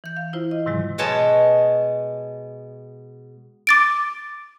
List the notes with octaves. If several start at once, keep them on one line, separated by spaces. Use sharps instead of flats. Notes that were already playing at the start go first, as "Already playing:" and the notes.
E3 G6
F5
E4 F4 C5
D#5
G#2 C3 D#3 F#3 G#3
B2 G#3 B3 C#5 D#5 A5
D6 A6 D7